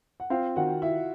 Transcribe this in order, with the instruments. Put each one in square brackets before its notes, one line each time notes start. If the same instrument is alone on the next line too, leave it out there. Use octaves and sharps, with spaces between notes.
[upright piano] F#5
[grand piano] C4 [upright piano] F4 F5
[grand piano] D#3 [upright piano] F#4 F#5
[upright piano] E4 E5 [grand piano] F4